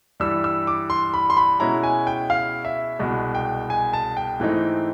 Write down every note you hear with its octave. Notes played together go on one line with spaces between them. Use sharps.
G2 E3 G3 E6
E6
D6
C6
B5
C6
B5
B2 G#3 C#4 E4 A#5
G#5
G5
F5
E5
C2 B2 G#3
G5
G#5
A5
G5
G#2 E3 A3 C4 D#4